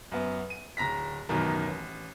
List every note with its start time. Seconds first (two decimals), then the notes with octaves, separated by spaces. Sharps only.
0.12 F#2 B3
0.50 D#7
0.77 D1 A#5 A#6 B6
1.29 A1 F#2 B2 D#3 A#4
1.67 A1